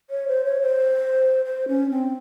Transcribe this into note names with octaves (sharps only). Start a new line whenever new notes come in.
C#5
C5
C#5
C5
C5
C#4
C4